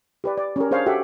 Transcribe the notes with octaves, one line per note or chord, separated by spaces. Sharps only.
G4 B4 D5
D5
C#4 G4 A#4
D4 G#4 C5 C#5 F5 A5
F#4 G4 A4 E5 F#5